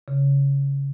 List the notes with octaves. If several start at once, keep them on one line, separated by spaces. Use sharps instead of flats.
C#3